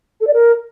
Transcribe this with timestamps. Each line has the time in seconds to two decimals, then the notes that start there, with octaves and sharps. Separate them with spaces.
0.20 A4
0.27 D5
0.33 A#4